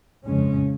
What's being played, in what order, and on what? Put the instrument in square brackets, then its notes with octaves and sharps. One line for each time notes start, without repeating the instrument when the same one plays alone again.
[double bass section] F2 C#3 G#3 C#4